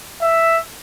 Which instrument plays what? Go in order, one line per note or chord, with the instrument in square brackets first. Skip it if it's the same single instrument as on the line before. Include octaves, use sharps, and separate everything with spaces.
[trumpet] E5